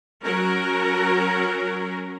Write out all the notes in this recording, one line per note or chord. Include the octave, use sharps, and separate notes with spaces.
F#3 C#4 F#4 A#4